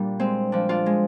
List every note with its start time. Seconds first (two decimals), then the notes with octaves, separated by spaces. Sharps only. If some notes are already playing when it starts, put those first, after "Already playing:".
Already playing: A#2 G3 D4 G4
0.19 G#3 C4
0.52 F3 D4
0.69 D4 F4
0.86 G#3